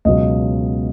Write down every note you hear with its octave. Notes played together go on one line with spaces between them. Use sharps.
C#2 B2 F#3 D#5